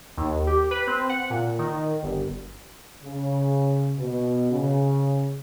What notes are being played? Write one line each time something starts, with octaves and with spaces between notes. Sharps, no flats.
D#2
G4
B4
C4
F#5
A#2
D#3
G1
C#3
B2
C#3